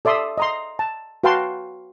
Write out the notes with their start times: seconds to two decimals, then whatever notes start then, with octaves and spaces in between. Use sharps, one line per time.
0.05 A4 D5 E5 C6 D#6
0.38 D#5 A#5 C6
0.79 A5
1.24 F#4 B4 F5 G5 A5 C6